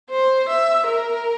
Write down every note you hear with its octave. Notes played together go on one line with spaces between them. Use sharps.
C5
E5
A#4